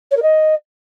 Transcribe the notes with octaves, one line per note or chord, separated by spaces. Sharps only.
C#5
A#4
D#5